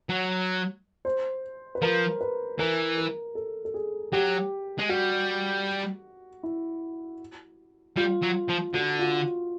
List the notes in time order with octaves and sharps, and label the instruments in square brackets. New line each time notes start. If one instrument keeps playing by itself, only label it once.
[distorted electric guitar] F#3
[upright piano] C5
B4
[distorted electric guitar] F3 [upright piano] A#4
[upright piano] B4
[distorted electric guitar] E3 [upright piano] A#4
[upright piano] A#4
A4
A4
G#4
[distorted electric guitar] F#3 [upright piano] G4
[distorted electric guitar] G#3
[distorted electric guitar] G3 [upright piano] F#4
[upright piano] E4
[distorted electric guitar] G3 [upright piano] F4
[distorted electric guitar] F#3
F3
[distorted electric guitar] D3 [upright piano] F#4
[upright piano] F4